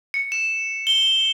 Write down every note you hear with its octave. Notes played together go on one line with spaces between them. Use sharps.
C#7
E7
G7